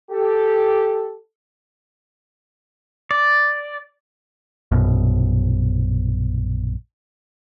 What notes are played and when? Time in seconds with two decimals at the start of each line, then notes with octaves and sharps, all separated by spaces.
0.11 G4 A4
3.11 D5
4.71 A#1 F#2 B2